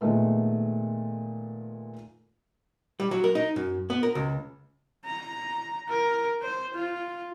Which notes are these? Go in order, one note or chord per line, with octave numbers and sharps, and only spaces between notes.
A#2 D#3 G#3 A3 B3
G3
F#3
A#4
D#4
F#2
B3
A#4
C#2
A#5
A#4
C5
F4